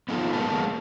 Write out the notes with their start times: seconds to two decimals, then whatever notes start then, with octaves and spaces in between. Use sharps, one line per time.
0.09 B3 D#4 F4 A4
0.33 G#3 A#3 B3 A5